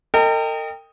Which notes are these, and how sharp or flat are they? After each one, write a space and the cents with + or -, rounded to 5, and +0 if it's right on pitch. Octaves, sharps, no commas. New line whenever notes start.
A#4 -45 D#5 +0 G5 +15